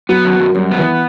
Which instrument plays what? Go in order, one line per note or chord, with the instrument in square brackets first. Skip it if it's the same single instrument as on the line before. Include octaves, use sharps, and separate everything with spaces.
[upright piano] F#3 [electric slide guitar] B3
[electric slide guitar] F#2
F#2
[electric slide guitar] F#2 [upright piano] G3
[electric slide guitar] B3
[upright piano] E3